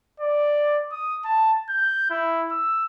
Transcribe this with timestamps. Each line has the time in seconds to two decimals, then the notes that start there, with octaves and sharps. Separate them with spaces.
0.20 D5
0.92 D#6
1.25 A5
1.70 G6
2.10 E4
2.52 E6